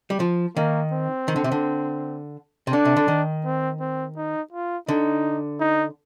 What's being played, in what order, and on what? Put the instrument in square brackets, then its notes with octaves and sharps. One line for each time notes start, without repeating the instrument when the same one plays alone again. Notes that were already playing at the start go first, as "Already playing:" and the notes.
[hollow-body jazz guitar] G3
F3
[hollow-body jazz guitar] D#3 [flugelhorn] A#3
[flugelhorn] C4
[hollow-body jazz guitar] D#3
D3
C3
D3
C3
[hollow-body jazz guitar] D3 [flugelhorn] D4
[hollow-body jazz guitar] C3
D3
D#3
[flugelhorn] C4
C4
D#4
F4
[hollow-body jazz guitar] D3 [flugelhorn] D#4
[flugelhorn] D#4